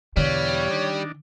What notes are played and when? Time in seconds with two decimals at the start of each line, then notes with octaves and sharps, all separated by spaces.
0.17 E2 B2 D3 G3 C#5 F5
0.70 D#3 D4